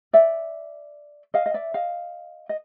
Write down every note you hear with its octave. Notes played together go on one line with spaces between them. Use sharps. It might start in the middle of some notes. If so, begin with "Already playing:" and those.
D5 E5
D#5 F5
D#5
D5 E5
D#5 F5
D#5